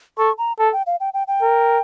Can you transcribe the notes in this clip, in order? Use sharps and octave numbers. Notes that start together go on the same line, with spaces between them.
A4 C#6
A#5
A4 A5
G5
F5
G5
G5
G5
A#4